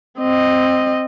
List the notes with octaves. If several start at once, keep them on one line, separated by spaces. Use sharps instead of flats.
C4 D#5